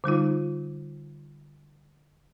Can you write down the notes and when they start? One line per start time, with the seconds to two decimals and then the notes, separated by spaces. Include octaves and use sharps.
0.04 D3 G3 D#4 F4